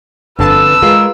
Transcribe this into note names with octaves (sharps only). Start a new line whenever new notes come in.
G1 F2 D3 B4 A5 E6
G#3 F4 A#4